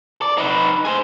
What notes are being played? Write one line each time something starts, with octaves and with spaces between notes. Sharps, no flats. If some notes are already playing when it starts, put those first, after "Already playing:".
D5
D#4 B4
G#4 C5